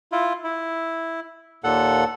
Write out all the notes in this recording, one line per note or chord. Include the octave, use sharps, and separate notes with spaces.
E4 F4
E4
D#2 A#2 A4 F#5